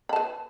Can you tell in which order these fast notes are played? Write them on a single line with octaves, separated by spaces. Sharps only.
B5 A5 B4